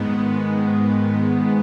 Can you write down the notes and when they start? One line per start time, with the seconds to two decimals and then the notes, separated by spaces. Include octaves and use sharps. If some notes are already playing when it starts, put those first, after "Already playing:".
Already playing: G#2 D#3 G#3 B3